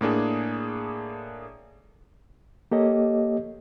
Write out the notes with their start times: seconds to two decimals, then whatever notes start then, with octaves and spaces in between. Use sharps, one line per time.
0.01 A2 A#3 D4 G#4
2.71 A#3 G4 A4 C#5 D#5